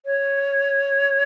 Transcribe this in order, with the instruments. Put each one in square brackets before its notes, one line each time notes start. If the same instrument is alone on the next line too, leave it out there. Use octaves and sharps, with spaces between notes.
[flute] C#5